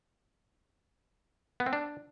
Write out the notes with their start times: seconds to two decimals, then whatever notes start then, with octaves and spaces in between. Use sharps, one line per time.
1.60 B3
1.66 C4
1.73 D4